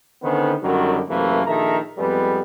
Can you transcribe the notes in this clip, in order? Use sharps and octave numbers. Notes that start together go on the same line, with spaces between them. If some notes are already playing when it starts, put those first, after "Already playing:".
D3 D#3 B3 C#4 C5
F#2 D3 D#3 F#3 G3
F#2 C3 E3 A3 A#3
A#1 D#3 A4 E5 A#5
F2 G3 G#3 B3